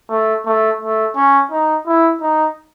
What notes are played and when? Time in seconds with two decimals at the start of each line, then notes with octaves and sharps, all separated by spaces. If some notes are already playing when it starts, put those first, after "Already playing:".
0.09 A3
0.46 A3
0.81 A3
1.16 C#4
1.51 D#4
1.86 E4
2.21 D#4